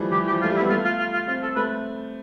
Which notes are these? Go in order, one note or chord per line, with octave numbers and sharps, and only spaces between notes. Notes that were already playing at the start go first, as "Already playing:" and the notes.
Already playing: E3 F3 G3 A3
E3 G4
G4
F3
F4
A3
G3
E4
B3
A3 F4
F4
F4
F4
C4 F4
A4
A3 B4